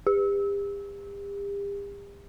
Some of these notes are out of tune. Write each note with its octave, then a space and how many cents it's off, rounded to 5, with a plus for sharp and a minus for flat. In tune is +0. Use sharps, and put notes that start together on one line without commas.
G4 +40